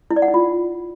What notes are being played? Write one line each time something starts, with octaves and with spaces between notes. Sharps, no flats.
E4
D5
F#5
D#4
F4